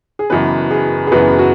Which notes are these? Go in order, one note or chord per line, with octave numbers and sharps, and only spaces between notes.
G#4
F#1 F#2 E3 B3 B4
G#4
G#4
F#1 F#2 E3 B3 B4
G#4
F#4